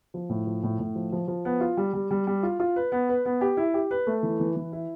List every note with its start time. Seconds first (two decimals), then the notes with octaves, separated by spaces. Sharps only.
0.14 F3
0.29 A2
0.46 F3
0.63 A2
0.79 A2
0.95 F3
1.12 F3
1.28 F3
1.45 B3
1.61 F4
1.77 G3
1.93 G3
2.11 G3
2.27 G3
2.43 F4
2.60 F4
2.76 B4
2.92 B3
3.09 B4
3.26 B3
3.41 G4
3.57 E4
3.74 G4
3.91 B4
4.07 A3
4.23 E3
4.40 E3
4.56 E3
4.72 E4